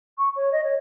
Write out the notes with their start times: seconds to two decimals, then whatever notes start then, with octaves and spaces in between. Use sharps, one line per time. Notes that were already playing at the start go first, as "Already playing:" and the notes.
0.18 C#6
0.36 C#5
0.52 D#5
0.64 C#5